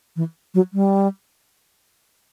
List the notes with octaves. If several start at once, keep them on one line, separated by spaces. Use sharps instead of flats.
E3
F#3
G3